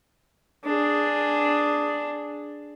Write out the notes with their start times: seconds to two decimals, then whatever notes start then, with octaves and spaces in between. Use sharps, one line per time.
0.65 D4 G#4